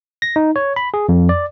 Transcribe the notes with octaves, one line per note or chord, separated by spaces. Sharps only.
A#6
D#4
C#5
B5
G#4
F2
D5